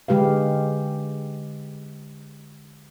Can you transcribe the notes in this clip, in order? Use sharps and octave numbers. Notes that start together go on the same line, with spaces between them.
D3 G#3 G4 B4 F5